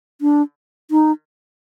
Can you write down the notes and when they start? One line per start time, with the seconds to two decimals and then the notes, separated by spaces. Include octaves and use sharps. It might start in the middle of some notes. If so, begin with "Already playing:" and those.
0.21 D4
0.91 D#4